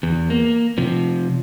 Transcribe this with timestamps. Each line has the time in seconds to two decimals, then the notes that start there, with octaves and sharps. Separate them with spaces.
0.03 E2
0.30 A#3
0.78 C3 F3